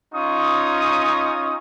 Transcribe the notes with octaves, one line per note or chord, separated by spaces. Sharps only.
C#4 D#4 F4 C#6 D#6